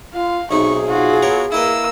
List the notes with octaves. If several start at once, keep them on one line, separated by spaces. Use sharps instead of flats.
F4 F5
B1 C3 D#4 G#4 C#6
F4 F#4
B3 A#4 C#5
A#3 E4 B4 D#5 E6